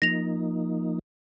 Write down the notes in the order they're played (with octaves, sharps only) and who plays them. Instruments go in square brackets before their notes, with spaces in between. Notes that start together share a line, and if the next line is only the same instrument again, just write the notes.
[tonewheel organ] F3 A#3 D#4 [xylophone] A#6 F7